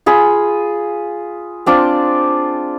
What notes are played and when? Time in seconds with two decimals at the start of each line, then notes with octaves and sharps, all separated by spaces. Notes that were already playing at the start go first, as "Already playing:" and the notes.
0.06 F4 G#4 B5
1.66 C4 D4 F4 D5